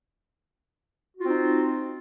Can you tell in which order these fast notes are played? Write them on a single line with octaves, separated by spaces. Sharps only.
F#4 F4 C4 D#4